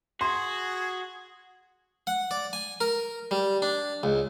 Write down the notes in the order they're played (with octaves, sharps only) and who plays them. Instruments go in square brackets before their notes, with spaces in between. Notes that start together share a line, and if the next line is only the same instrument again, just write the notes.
[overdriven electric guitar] F#4 [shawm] G#4 [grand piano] C6
[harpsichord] F#5
D5
G#5
A#4
G3
D4
C#2